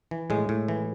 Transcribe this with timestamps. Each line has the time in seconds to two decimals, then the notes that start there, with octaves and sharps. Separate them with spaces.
0.11 E3
0.30 A2 G#3
0.49 A2
0.68 E3